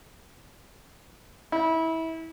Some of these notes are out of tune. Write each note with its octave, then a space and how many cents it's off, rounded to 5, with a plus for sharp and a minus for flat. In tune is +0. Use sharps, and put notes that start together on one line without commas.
E4 -25